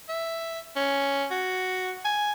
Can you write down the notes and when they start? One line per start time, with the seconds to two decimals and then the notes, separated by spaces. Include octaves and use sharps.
0.09 E5
0.76 C#4
1.31 F#4
2.05 G#5